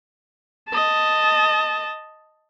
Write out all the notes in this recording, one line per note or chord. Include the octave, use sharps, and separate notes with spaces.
D#5 A5